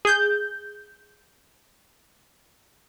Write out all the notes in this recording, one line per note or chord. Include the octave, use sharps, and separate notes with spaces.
G#4 G6